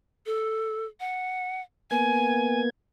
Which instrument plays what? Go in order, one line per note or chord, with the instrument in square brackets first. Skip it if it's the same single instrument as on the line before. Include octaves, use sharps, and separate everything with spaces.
[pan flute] A4
F#5
[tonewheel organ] A#3 B3 G#6 [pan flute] G#5